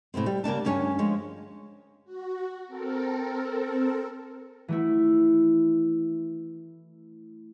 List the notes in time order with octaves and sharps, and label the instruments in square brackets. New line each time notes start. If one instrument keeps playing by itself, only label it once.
[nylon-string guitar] A2 C3 B3 C4
G3
C#3 A#3 D4 A5
D2 G2 C#4 C#5 G5 G#5
F3 G#3 C#5
[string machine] F#4
C4 A4 A#4
[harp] E3 A3 E4